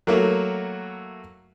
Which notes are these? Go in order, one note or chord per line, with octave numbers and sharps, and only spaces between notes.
F#3 A3 A#3 E4 F#4